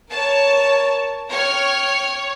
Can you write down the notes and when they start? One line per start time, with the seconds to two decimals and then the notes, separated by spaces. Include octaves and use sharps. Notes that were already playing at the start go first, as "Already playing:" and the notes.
0.10 A#4 C#5 A5
1.30 C#5 G5 F6